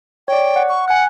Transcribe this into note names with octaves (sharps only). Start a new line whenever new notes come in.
C#5 D5 G5
F#5
C#6
F#5 G#5 F#6